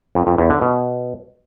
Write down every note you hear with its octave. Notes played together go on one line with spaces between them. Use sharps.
F2
F2
E2
D3
B2